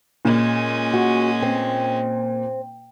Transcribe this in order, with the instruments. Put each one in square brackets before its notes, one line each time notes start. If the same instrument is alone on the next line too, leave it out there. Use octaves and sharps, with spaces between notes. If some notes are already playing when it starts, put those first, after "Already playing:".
[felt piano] A#2 [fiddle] G#3 C#4
[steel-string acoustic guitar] F#4
C4